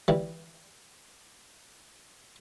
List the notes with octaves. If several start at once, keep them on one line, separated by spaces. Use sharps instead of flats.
E3 G3